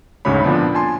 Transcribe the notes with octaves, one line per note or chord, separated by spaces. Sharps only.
D2 G#2 C#3 F#4 C#5 B5
A#2 F3 B3 C4 D4
G#5 A5 C6